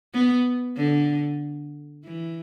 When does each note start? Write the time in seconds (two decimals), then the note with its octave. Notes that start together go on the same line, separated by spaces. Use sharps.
0.14 B3
0.77 D3
2.05 E3